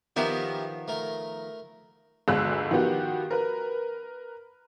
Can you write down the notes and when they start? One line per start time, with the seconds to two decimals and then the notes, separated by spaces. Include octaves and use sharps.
0.16 D#3 F3 B3 G4 A#4 E5
0.88 A3 A#4
2.28 G1 D2 G#3 E6 F#6
2.71 D#3 F3 B3 F#4 G4
3.30 A#4 B4